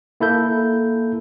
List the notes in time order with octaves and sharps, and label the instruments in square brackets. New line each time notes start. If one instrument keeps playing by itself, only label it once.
[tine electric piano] A#3 E4 A4 G6